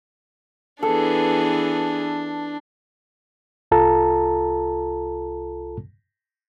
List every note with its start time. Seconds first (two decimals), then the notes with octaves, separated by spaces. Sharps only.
0.83 E3 B3 D4 G#4 A4
3.71 C2 F4 A4 A5 A#5